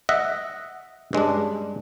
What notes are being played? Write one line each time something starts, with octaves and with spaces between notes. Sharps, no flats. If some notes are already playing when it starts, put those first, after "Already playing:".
D#5 E5 F#5
G2 G#3 C#4 D4